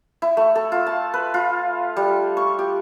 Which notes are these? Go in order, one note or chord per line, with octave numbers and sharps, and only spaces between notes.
E4
A3
A4
F4
A5
B4
F4
G3
C#6
G4